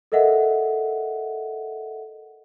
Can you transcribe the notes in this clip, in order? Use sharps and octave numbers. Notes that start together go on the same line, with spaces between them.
A4 A#4 D#5 E5 F#5